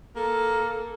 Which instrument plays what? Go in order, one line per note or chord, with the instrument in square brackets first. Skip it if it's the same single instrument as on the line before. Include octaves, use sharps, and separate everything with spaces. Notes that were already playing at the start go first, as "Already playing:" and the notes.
[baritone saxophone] A#3 [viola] A4